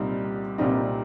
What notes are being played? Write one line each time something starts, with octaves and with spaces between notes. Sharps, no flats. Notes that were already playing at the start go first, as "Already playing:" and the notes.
Already playing: C2 A#2 G3 C4 D#4
C2 A#2 G3 C4 D#4